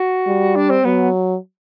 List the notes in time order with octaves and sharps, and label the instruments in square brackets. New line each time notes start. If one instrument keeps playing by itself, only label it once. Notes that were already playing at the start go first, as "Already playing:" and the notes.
Already playing: [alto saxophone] F#4
[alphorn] G3
[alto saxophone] D4
C4
[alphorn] F#3 [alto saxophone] B3